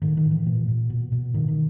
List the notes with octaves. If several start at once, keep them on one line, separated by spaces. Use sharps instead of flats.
A2 D#3
D#3
A2
E3
A#2
A#2
B2
B2
A2 D#3
D#3